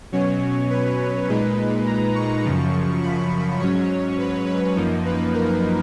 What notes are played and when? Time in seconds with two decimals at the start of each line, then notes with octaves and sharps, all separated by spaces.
0.12 B2 F#3 C#4 C#5
0.70 B4
1.28 A#2 G#3 D#4 B4
1.86 A#5
2.15 C#6
2.44 F#2 C#3 F3
3.02 B5
3.60 G#2 F#3 C#4 C#5
4.18 B4
4.47 B4
4.76 F#2 F3 A#3 D#4
5.05 B4
5.34 A#4